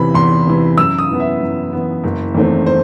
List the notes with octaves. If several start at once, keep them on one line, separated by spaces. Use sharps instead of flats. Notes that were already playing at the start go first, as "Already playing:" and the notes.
Already playing: E2 C3 E3 B5
E2 C6
C3 E3
F#2 E6
D#6
E3 B3
E5
F#2
E3 B3
F#1
E2 D#3 A3 C4
C5